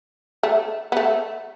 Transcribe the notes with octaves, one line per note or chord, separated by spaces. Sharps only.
A3
B3
A3